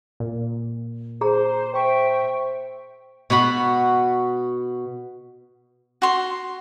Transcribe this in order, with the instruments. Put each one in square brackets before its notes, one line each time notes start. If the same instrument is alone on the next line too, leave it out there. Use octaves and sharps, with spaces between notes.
[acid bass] A#2
[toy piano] G#4 A#5 [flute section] C5
[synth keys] C5 C#6 [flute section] E5 G5
[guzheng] B2 B3 F#4 B5
[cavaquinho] F#4 C6